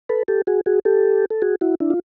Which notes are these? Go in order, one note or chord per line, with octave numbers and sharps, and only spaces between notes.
A4 B4
G4 A4
F#4 G#4
F#4 G#4
G4 A4
A4
F#4 G#4
E4 F#4
D4 E4
F4